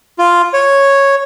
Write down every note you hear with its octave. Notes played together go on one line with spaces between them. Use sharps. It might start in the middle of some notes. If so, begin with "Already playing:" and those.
F4
C#5